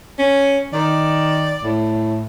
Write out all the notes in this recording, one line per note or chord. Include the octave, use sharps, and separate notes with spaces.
C#4
D#3 D5
A2